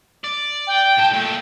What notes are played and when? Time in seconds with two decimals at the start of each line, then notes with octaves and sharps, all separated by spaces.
0.24 D5
0.67 G5
0.98 A2 A5
1.13 A#2 A3